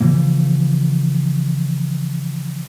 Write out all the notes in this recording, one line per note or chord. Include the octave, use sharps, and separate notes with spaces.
C#3 E3 F3 A#3